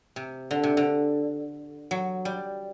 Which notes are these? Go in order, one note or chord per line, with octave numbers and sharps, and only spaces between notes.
C3
D3
C3
D3
F#3
G3